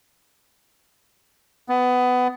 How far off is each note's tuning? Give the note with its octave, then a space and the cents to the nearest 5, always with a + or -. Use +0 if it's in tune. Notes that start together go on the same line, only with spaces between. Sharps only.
B3 +20